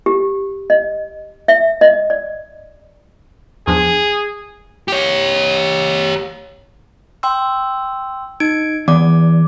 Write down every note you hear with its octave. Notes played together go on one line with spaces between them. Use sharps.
G4
D#5
E5
D#5
D5
E2 F3 D4 G#4
G4 C#5
G5 C6 E6
D#4 G#6 D7
E2 D5 D6